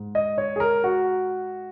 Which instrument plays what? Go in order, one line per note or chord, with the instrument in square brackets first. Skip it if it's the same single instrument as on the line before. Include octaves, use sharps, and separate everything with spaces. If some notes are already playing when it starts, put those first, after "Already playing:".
Already playing: [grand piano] G#2
D#5
C#5
G#4
A#4
F#4